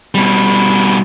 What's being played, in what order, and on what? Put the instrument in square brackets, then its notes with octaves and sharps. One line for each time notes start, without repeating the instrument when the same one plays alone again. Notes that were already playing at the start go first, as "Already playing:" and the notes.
[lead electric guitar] B2 G3